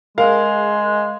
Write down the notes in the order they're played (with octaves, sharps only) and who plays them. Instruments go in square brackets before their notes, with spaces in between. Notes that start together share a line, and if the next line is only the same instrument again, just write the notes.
[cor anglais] G#3 [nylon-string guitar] G#4 A#4 [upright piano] F5